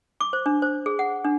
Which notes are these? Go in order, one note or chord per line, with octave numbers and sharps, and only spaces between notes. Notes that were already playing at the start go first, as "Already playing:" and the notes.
D6
C5
D4
C5
G#4
F#5
D4